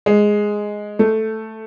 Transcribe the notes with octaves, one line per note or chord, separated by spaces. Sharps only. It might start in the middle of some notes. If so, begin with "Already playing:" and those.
G#3
A3